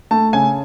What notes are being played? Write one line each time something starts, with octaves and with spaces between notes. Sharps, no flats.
A3 A5
C#3 G#5